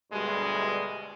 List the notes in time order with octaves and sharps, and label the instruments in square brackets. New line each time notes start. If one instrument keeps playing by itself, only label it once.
[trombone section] D2 G2 B2 G3 G#3